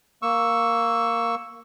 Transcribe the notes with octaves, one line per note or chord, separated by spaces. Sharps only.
A#3 C#6 E6